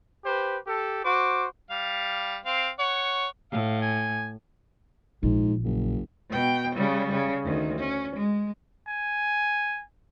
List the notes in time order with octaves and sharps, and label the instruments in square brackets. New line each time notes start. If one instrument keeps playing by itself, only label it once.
[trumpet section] G4 B4 C5
G4 A4
F#4 C5 D6
[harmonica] G3 F5
C4 F5
C#5 F#5
[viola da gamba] A2 [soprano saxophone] F5
[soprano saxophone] G#5
[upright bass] A#1 [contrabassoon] G#2
[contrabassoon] F#1
[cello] B2 G5
C#3 G3
C#3
D2 D#3
C#4
G#3
[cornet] G#5